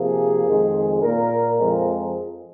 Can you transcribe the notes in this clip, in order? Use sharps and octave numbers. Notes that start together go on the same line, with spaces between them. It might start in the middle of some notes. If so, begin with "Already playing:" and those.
Already playing: C3 F3 A#3 G#4
F2 D#3 G#3
A#2 A#3 A#4
F2 F3 G#3 C4 A#4